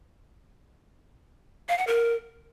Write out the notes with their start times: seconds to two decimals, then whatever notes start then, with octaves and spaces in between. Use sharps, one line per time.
1.69 F5
1.78 F#5
1.87 A#4